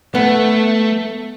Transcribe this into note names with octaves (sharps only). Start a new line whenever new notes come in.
A3 B3